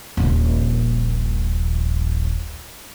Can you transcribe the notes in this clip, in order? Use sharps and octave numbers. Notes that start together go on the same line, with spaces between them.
D#1 A#1